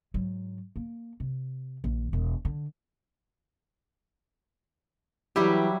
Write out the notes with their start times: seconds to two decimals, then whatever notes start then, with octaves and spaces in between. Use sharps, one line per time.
0.14 G#2 F#3
0.76 A#3
1.20 C3
1.84 A#1 D#3
2.13 E1
2.45 D3
5.36 E3 F#3 G3 E4 G4